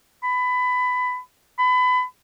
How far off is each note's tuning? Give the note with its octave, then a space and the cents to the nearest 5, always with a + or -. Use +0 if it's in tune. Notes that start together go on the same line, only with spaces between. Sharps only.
B5 +20
B5 +30